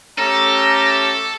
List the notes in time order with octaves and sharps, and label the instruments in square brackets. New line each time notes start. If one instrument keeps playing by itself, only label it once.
[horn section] A3 C#4 G4 [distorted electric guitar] A4 [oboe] A#5